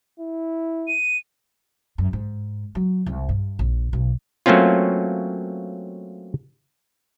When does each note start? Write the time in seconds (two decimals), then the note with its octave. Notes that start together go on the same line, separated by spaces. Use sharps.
0.19 E4
0.88 D#7
1.98 F#2
2.13 G#2
2.75 F#3
3.06 C2
3.29 G2
3.59 A#1
3.93 B1
4.46 F#3 A3 A#3 C4 C#4 F4